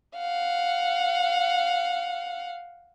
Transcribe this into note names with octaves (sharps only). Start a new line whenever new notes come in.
F5 F#5